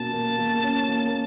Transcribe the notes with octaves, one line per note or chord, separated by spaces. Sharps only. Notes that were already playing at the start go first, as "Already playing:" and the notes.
Already playing: B2 A#3 C#4 A5
A#3
A#3
C#4
A#3